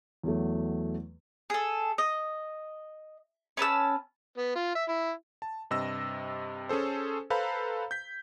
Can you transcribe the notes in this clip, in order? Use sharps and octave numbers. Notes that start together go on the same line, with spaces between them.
E2 F#3 A3
G#4 A4
D#5
C#4 B4 A5 E6
B3
F4
E5
E4
A5
G2 C3 D#5 E6 A#6
C#4 G#4 A4 C5
A4 B4 C5 F5 A#5 B5
G6 B6